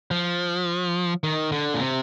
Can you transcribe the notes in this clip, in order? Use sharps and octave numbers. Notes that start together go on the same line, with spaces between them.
F3
D#3
D3
A#2
C3